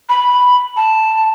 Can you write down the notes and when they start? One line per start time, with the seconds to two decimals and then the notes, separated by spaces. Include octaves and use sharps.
0.09 B5
0.76 A5